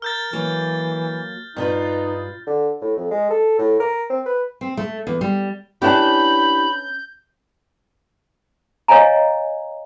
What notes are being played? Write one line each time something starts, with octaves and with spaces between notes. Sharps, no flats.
A#4 F6 G6 A6
E3 F#3 A#3
G2 D#4 F4 B4
D3
A2
F2
G#3
A4
A2
A#4
C4
B4
C4
A3
E2
G3
C#4 D4 E4 G4 B4 A5 B5 G6
C#5 D#5 F5 G#5 A#5